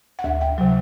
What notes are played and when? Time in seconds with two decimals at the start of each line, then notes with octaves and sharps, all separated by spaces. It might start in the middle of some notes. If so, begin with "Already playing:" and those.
0.19 F#5
0.24 D2 E5
0.41 G5
0.58 C3 F#3